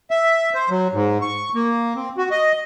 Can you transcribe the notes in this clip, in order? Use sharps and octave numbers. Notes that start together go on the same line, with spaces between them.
E5
C5
F#3
G#2
C#6
A#3
C4
F#4
D#5